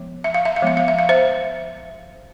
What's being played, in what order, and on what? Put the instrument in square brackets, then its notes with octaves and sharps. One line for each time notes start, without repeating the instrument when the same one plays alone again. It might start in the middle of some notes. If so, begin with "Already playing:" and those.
Already playing: [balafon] F3 G#3 B3
E5
F5
E5
F5
F3 G#3 B3 E5
F5
E5
F5
C5 E5